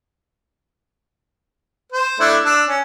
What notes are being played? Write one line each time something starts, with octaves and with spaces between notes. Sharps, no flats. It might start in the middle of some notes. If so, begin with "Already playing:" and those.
C5
A3 D4 E4
D4 E6
C#4